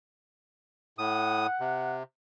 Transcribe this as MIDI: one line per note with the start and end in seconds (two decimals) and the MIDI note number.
0.98 1.47 45
0.98 1.97 78
0.98 1.47 87
1.60 2.03 48